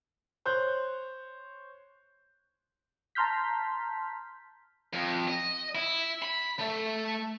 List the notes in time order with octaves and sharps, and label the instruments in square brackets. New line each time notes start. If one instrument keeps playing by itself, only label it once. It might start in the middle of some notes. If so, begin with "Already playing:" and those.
[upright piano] C5 C#5 F#6 G6
[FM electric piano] A5 A#5 C6 F6 G6 B6
[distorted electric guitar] F2
D#5
E4
B5
A3